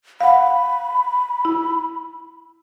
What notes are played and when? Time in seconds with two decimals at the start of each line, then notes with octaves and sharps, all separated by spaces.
0.21 F5 F#5 B5
1.45 E4